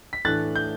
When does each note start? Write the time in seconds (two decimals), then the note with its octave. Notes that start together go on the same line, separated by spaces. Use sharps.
0.13 B6
0.25 A2 E3 A3 D4 F#6 A6
0.55 G6